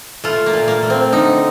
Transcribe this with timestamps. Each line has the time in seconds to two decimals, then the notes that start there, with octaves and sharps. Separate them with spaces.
0.24 A3 F4
0.46 A#3
0.53 A#2
0.68 A#3
0.83 A3
0.90 C4
1.12 D3 D#4